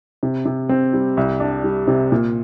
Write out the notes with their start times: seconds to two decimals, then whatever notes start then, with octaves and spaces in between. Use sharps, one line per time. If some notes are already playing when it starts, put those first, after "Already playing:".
0.23 C3
0.45 C3
0.69 C4
0.93 G3
1.17 C2
1.40 D4
1.64 G3
1.88 C3
2.12 A#2